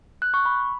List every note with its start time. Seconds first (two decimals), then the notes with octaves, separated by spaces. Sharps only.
0.22 F#6
0.34 C#6
0.46 B5